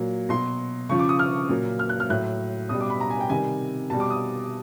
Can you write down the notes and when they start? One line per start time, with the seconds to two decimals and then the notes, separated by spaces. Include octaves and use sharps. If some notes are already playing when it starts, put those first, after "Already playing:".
Already playing: A#2 F#3
0.29 B2 F#3 C6
0.89 C#3 F3 C#6
0.99 D6
1.09 D#6
1.19 F6
1.49 A#2 F#3
1.79 F6
1.89 F#6
2.00 F6
2.10 A2 F#3 F#6
2.69 B2 G3 D#6
2.80 D6
2.90 B5
3.00 A#5
3.10 G#5
3.20 G5
3.29 C3 D#3 G3 G#5
3.90 B2 G3 A5
4.00 D6
4.10 D#6